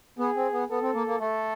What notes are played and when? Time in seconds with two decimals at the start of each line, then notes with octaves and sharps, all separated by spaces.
0.19 B3 G#4
0.36 C4
0.53 B3
0.70 B3 A4
0.82 C4
0.94 A#3
1.07 A#3
1.19 A3 A4